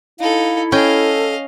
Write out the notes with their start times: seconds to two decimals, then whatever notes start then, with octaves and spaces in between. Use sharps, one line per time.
0.20 D#4 E4 A4 F5
0.72 C#4 A4 D#5 F5 G5